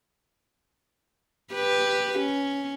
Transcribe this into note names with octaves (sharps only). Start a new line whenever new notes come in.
G4 B4
C#4